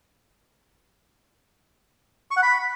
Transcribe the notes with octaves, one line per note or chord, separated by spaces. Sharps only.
C#6
F#5
B5